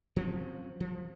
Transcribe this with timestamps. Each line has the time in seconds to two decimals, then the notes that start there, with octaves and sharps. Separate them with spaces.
0.16 F3 F#3 C4 C#4
0.80 F3